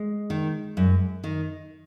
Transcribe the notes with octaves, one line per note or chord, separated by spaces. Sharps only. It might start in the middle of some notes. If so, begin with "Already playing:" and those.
Already playing: G#3
D#3
F#2
D#3